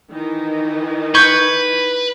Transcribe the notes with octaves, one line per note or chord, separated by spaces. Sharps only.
D#3 E3 D#4
B4 C#6 G6 G#6